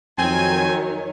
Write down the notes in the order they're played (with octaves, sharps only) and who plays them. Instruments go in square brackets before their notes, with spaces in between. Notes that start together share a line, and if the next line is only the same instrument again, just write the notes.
[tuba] F2 [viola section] D#3 F#3 C#5 [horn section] C4 G5 G#5